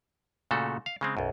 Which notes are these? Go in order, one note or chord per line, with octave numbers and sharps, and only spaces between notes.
A#2 C#3 A3 F#4 A4
F5
C#3 G#3 C4
B1 F#2